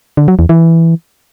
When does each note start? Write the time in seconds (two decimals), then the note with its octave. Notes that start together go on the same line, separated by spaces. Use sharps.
0.17 D3
0.28 F#3
0.39 E2
0.49 E3